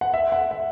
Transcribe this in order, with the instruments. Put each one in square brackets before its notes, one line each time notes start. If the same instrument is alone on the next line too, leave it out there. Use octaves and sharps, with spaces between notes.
[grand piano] F#5
E5
F#5
E5